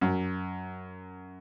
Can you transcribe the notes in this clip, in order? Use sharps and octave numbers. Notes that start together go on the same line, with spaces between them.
F#2